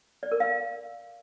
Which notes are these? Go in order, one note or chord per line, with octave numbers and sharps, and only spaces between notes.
D5
A#4
F5